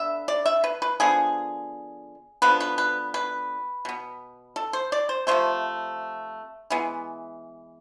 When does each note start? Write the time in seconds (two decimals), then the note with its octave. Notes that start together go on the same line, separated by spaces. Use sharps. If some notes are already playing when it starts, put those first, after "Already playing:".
Already playing: D3 B3 E5
0.28 D5
0.46 E5
0.64 B4
0.82 B4
1.00 D3 F3 B3 G#4
2.42 D3 F3 B3 B4
2.60 B4
2.78 B4
3.14 B4
3.85 B2 B3
4.56 A4
4.73 C5
4.92 D5
5.09 C5
5.27 C3 F3 A3 C5
6.70 E3 G#3 B3